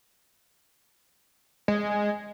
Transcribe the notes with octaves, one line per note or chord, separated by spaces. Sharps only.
G#3